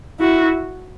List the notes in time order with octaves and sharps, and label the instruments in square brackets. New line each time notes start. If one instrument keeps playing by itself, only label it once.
[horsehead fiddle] E4 [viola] F#4